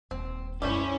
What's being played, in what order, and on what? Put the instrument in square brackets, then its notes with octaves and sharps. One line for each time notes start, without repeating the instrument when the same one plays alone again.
[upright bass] D#1 [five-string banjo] C4
[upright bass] C2 F#2 [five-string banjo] G3 A3 C5 [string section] C#4 E4